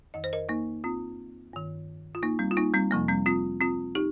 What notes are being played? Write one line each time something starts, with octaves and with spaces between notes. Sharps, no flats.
F2 D#3 D#5
C5
A#4 D#5
A#3 D#4
C4 F4
G2 D#3
F4
A#3 D#4
G3 C4
F4
A#3 D#4
G3 C4
F2 C3 F3 A#3
G3 C4
C4 F4
C4 F4
D#4 G4